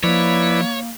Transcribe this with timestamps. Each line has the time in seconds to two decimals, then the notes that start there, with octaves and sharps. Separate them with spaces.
0.03 F3 A#3 E4 B4 C#5 D5